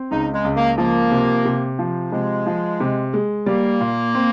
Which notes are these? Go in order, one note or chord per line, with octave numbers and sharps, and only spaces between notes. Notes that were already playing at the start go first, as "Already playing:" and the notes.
Already playing: C4
C#2 D#4
G#3
C#2
A#3
F3 A#3
C3
C3
F3
C3 G#3
F3
C3
G#3
G3 A#3
A#2
C4